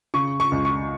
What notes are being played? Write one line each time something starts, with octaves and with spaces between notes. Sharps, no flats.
C#3 C#6
C#6
C#2
C#6